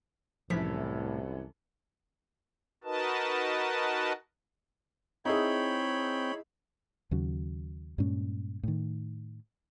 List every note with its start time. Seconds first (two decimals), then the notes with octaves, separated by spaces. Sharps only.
0.50 C2 F#2 A2 E3 F3 B6
2.84 D#4 F#4 A#4 B4 D#5 A5
5.25 C4 D#4 E4 G#4 C#5 G5 B5
7.11 D#2 C#3 F#3
7.98 G2 A#2 G#3 C#4
8.63 A2 D#3